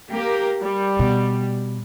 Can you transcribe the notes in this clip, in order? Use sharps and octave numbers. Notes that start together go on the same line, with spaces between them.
A#3 G4 A#4
G3
B2